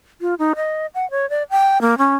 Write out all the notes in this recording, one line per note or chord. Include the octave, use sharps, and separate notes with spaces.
F4
D#4
D#5
F#5
C#5
D5
G5
A#3
C#4